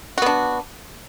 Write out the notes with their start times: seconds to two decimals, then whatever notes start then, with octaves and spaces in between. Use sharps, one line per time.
0.18 F#4
0.22 B3
0.26 D4